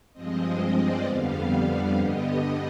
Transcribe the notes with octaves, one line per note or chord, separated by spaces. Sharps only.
G2 F3 G#3 C4 D#5
D#5
D5
F2 D3 G3 B3 F5
F5
G2 D3 G3 B3 D#5